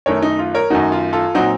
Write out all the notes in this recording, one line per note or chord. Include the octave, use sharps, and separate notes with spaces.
F#2 D#3 A3 A#4 C#5
D#4
F4
A#4 C#5
F#2 D#3 A3 D#4 F#4
F4
F4 A4
A#2 F#3 C4 D#4 F#4